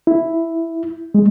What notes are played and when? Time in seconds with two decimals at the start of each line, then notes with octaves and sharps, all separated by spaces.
0.07 E4
1.15 G#3